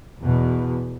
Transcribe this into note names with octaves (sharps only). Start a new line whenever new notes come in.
E2 B2